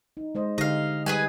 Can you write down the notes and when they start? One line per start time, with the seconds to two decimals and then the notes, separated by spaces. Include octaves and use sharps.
0.17 D#4
0.35 G#3 C5 D#5
0.58 D3 D#4 G4 D#5 F5
1.06 G3 G#4 B4 D#5 G#5